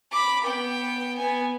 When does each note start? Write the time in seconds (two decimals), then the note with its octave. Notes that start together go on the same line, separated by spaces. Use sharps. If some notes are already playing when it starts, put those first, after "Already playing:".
0.12 B5 D6
0.43 B3 G5
1.17 B3 G#5